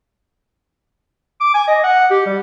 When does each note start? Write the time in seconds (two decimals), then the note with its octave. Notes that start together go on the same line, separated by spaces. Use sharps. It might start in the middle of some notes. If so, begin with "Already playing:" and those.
1.41 D6
1.54 G#5
1.68 D#5
1.84 F#5
2.10 G4
2.26 G3